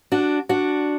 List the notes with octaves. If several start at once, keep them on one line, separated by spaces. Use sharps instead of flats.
D4 F#4
D4 F#4